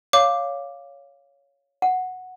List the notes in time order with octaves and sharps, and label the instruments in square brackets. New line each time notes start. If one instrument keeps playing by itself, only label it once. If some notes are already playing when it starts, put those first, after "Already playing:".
[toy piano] C#5 [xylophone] F5 D6
[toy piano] F#5